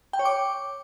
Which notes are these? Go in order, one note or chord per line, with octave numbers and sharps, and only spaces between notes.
G5
C#5
D6